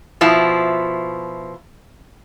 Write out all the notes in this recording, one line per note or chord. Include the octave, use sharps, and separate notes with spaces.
B2 F3 E4